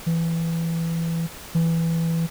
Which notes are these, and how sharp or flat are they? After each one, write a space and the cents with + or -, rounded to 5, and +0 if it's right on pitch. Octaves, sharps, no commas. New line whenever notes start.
E3 +10
E3 +5